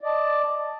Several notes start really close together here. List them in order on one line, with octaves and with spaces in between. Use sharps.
D5 D#5 A5